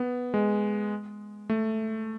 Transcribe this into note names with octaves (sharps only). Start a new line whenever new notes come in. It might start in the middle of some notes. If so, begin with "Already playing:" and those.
Already playing: B3
G#3
A3